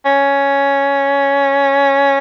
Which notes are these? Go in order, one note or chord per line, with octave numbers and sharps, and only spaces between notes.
C#4